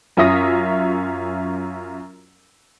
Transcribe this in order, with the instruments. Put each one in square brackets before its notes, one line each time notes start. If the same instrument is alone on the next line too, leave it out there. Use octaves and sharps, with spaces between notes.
[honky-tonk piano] F#2 C#4 F4 E5 D#6 A#6